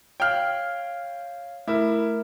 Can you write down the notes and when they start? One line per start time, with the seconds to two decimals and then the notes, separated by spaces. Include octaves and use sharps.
0.20 C#5 F5 G5 F6
1.68 A3 E4 A#4